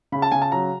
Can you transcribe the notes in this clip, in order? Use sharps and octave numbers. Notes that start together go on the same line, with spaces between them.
C#3 B5
A5
C#3 G#5
A5
F#3 A#5